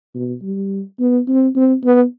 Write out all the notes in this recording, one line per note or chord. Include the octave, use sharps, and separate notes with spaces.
B2
G3
B3
C4
C4
B3